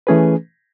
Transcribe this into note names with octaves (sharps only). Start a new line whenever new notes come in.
E3 A3 C#4 G#4 B4